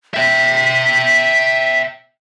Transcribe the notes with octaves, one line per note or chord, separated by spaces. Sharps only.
E5 G5 B6